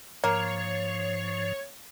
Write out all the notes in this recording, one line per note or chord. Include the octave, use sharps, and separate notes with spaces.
G#2 F3 A#3 C#5